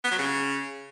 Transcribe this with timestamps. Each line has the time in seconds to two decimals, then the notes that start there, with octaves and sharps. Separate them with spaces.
0.04 B3
0.11 F#3
0.19 C#3